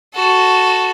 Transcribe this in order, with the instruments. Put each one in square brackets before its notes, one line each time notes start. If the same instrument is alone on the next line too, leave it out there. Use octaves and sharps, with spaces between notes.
[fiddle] F#4 A4